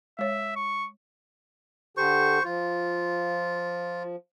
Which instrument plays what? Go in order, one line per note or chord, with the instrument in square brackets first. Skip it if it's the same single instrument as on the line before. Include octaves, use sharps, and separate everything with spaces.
[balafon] G#3 C#5 [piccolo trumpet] E5
[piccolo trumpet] C#6
[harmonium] D3 G4 A4 [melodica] C5 C#6
[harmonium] F3 [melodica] F4